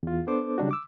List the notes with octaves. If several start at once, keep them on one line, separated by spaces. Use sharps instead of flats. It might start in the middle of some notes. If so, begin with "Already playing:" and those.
E2 F4
B3 D4 A4 C5 D6
C#3 F#3 G3 D4 D#4 F#4
D6 E6